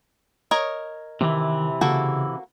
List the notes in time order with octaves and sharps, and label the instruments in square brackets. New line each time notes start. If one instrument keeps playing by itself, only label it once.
[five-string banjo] A#4 C#5 D#5
[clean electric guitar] C3 E3 [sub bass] D#3
[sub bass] C#3 [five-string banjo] A#3 F#4 A4